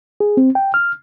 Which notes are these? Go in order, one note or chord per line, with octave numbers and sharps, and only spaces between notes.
G#4
C4
G5
F6